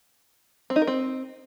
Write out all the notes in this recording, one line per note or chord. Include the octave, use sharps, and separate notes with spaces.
C4
D#4
A#4
C4